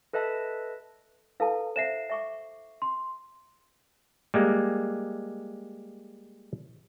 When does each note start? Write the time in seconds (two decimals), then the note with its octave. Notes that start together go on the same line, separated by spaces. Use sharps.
0.13 A4 B4 D#5 E5 A5
1.40 E4 A4 B4 F5 A5
1.76 C5 E5 F5 C7 E7
2.10 E5 C#6 D6
2.82 C6
4.34 G3 G#3 A#3